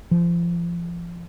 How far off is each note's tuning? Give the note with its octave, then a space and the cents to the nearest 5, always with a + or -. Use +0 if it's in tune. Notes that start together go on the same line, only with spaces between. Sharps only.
F3 -30